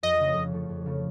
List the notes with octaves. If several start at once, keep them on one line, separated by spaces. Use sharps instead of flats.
F2 D#5
C#3 F3 A3
F2
C#3 F3 A3
F2
C#3 F3 A3